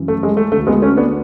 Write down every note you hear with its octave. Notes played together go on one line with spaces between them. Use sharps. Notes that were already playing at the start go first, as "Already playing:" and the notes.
Already playing: F#2 C#3 E3
A3
G#3
A3
D2 D3 A3
G#3 B3
A3 C#4
B3 D4